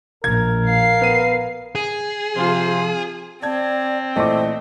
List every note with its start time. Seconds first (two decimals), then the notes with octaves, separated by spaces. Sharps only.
0.24 A#1 A#4 G#6
0.67 F5 C7
1.01 B3 D#7
1.75 G#4
2.36 C3 F3 F4 C5
3.42 C4 D5 A5 G#6
4.16 A#2 E3 A3 C5 D#5 D6